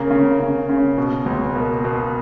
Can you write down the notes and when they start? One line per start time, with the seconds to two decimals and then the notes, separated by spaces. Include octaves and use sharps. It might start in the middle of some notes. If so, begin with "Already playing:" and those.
Already playing: C#3 A#3
0.11 C#3
0.40 C#3
0.69 C#3
0.97 B2
1.26 C#2
1.55 B2 A#3
1.84 B2